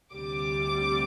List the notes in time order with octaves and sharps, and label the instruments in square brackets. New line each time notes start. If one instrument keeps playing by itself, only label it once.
[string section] D2 C3 G3 D6